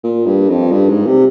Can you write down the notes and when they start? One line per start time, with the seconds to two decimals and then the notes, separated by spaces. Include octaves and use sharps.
0.03 A#2
0.26 G2
0.49 F2
0.72 G2
0.89 G#2
1.06 C3